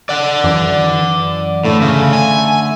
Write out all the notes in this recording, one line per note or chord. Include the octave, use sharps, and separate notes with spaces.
D5 F#5
F#2 E3 D6
A2 D3 A3
C#3
G#5